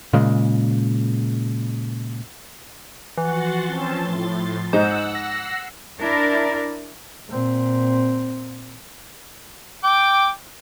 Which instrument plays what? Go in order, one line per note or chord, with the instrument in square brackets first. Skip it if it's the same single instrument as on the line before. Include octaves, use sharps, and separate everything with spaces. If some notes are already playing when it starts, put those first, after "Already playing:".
[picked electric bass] A#2 C#3 G#3
[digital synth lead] E3 [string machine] F3 C6 A6 [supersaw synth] F#4 F#5
[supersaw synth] C4 C#4 A5
A2
[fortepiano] G#2 D#4 [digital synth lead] C5 [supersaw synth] F#5 E6
[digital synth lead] A#6 [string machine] C7
[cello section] D4 E4 A#4 D5
[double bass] A#2 C4
[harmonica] G5 D6